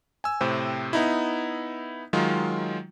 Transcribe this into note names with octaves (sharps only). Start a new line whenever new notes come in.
G#5 E6
A2 C3 C4 C5
B3 D#4 E4
D#3 F#3 G#3 F4